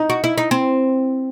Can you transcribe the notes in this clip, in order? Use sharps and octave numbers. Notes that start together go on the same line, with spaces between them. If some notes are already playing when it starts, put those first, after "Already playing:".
Already playing: D#4
F#4
E4
D#4
C4